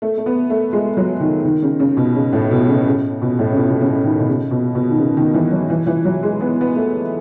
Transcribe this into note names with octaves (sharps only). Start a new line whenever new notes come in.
A3
A3
B3
A3
G#3
F#3
D#3
D#3
C#3
C#3
B2
C#3
A2
B2
C#3
C#3
B2
A2
C#3
B2
B2
C#3
D#3
B2
C#3
B2
B2
D#3
C#3
D#3
E3
F#3
E3
E3
F#3
G#3
B3
B3
A3